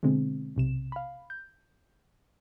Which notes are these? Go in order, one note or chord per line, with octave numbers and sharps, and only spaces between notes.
B2 D3 G#3 C4
B1 C3 E7
F5 B5
G6